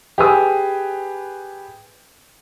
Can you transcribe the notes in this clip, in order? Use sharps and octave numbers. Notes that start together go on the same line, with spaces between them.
G4 G#4 B4 G#5 D#6